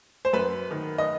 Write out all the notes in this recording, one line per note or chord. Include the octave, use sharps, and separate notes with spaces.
C5
F#2 B4
D#3
D#5